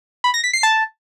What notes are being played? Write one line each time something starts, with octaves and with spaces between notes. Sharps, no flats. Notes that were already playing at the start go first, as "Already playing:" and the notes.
B5
A#6
B6
C7
A5